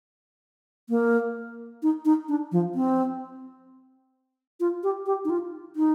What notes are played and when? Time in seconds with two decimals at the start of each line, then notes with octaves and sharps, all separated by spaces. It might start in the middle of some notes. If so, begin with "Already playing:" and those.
0.89 A#3
1.83 D#4
2.05 D#4
2.28 D4
2.52 F3
2.75 C4
4.60 F4
4.83 G4
5.06 G4
5.25 D#4
5.30 F4
5.76 D#4